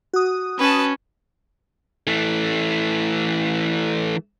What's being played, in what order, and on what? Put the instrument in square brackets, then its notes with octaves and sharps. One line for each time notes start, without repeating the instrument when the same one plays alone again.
[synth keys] F#4 D#6
[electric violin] C#4 [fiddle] B4 A5
[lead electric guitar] E3 A3